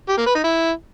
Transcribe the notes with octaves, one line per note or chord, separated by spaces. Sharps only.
G4
A#3
B4
D#4
E4